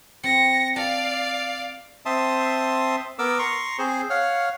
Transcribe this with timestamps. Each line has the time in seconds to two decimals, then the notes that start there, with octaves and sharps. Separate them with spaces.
0.23 C4 A#6 C#7
0.76 D5 F5 A5
2.06 C4 E5 A5 C6 D#6
3.19 B3 A#4 D6 E6
3.39 A#5 C6 C#6
3.79 C4 G#4 C5
4.10 C#5 F5 F#5 F6